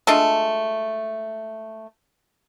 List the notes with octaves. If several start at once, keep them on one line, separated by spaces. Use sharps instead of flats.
G#3 A3 D4 F4